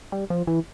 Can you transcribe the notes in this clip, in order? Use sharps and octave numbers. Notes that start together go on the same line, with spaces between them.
G3
F3
E3